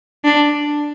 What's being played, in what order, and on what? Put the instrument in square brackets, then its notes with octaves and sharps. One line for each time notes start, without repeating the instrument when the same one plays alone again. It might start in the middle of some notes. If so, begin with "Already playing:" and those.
[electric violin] D4